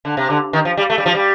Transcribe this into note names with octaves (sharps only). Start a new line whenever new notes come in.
D3
C3
D3
D#3
F3
G3
A3
G3
F3
G3